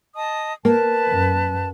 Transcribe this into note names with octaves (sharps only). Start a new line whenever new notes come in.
D#5 A5 D#6
A#3 B4 A5
F#2